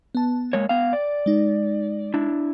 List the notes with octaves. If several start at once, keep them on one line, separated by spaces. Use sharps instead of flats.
B3 A5
G#3 A#3 C#5
B3 F5 G5
D5
G#3 D#4
D4 E4